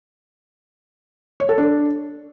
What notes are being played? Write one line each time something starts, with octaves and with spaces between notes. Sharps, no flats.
C#5
A4
D4